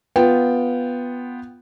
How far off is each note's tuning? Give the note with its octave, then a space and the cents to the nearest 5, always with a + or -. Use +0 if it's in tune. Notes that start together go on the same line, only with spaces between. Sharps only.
B3 +0 F4 +0 G5 +0